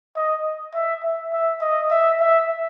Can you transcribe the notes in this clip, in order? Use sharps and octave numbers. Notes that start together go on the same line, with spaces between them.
D#5
E5
E5
E5
D#5
E5
E5